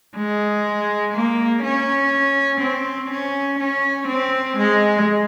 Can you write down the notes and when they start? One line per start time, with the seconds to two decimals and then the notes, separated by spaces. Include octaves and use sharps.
0.16 G#3
1.14 A#3
1.63 C#4
2.61 C4
3.11 C#4
3.59 C#4
4.08 C4
4.57 G#3